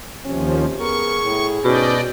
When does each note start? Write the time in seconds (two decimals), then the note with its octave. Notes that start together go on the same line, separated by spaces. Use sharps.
0.25 D#2 C3 F3 C#4
0.79 B3 G#4 A#4 C#6
1.21 A2
1.64 G#2 B2 C#4 D5 D#5 G5